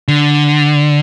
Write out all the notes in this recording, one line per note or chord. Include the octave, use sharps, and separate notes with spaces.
D3